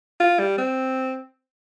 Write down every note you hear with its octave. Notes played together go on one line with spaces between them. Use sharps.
F4
G3
C4